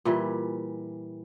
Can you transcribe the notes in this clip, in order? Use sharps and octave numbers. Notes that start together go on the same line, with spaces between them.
A#2 E3 G3